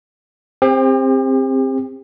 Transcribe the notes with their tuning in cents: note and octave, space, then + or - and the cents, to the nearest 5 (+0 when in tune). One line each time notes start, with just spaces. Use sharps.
C4 +10 G4 +40